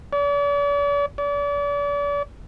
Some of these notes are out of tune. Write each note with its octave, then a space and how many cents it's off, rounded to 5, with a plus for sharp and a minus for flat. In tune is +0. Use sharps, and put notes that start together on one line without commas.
D5 -45
D5 -40